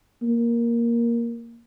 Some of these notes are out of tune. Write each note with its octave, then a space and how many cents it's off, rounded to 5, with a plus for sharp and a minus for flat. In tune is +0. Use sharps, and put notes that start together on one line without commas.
A#3 +5